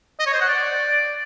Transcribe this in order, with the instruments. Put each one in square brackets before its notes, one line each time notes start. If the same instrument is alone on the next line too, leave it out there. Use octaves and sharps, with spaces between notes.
[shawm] D#5
C#5
C5
F#5
D5